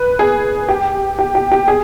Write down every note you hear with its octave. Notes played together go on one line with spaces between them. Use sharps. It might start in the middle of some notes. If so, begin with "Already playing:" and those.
Already playing: B4
G#4
G4
G4
G4
G4
G#4